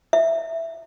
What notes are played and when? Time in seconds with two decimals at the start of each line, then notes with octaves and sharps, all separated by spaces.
0.13 E5